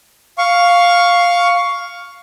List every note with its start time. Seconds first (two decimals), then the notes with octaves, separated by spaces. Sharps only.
0.38 F5 C#6